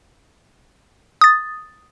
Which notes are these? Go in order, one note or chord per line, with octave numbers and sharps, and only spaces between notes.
D#6 A6